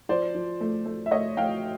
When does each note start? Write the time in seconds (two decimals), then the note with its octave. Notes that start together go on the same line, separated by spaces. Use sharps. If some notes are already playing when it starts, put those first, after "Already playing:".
0.09 F3 C5 D5
0.35 F3
0.61 A3
0.86 A3
1.06 E5
1.11 A3 C#5 D#5
1.37 A3 F5 G5